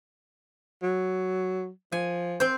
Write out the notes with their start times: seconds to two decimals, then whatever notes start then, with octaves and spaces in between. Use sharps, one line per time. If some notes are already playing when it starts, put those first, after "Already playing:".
0.83 F#3
1.92 F3 G#5
2.40 C4 C5